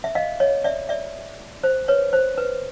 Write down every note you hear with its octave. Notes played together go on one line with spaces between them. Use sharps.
E5
D#5 F5
C#5 D#5
D5 E5
D5 E5
C5
B4 C#5
C5
B4